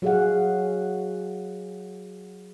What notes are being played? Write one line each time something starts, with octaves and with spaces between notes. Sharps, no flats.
F#3 F#4 G#4 D#5 F5 F#5